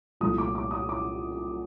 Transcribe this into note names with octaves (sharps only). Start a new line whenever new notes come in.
C2 A#2 F3 A3 D#6
D6
D6
D#6
D6